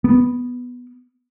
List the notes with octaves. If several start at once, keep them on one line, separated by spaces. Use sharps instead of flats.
B3